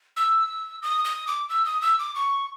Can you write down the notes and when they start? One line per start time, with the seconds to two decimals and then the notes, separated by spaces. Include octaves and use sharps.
0.17 E6
0.82 D#6
1.05 D#6
1.28 D6
1.49 E6
1.66 D#6
1.82 E6
1.99 D6
2.15 C#6